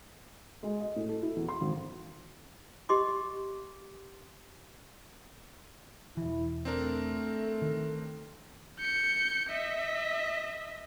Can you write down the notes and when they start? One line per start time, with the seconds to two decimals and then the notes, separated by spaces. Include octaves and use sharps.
0.63 G#3
0.80 D#5
0.96 A2
1.09 A4
1.23 E4
1.36 E2
1.48 C6
1.61 G#1
2.89 G4 D#5 C6 D6
6.17 E1 E3 E4
6.65 A3 C4 D4 A#4
7.62 D#3
8.79 G6 C#7
9.50 D#5 E5